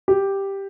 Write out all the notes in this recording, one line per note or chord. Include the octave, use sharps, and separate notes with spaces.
G4